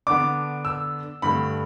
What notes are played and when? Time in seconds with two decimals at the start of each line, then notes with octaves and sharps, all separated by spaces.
0.07 D3 B3 D4 D6
0.65 E6
1.22 G2 D3 A3 B5